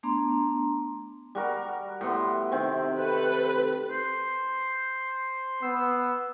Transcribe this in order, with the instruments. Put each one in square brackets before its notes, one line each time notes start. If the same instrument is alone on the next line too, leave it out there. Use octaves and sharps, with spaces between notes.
[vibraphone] A3 B3 D4 A#5 C6
[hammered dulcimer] G3 F#4 A#4
A2 B3 C6
C3 D#3 C4
[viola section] A4 B4
[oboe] C5
[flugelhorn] B3 [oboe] E6